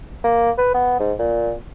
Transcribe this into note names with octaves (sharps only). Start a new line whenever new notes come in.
A#3
B4
B3
G#2
A#2